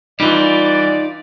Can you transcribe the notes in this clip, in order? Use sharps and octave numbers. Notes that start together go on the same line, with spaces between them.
E3 G3 D#4 F4 D5